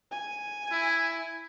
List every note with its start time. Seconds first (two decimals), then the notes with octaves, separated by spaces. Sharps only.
0.12 G#5
0.72 E4